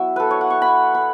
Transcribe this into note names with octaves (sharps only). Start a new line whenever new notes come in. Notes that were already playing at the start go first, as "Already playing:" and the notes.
Already playing: F#3 B3 E4 E5
A4 B4
C#5
F#5
C#6
B5
B5